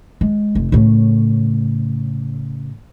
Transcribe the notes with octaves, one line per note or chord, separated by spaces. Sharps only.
G#3
F1
A2 C#3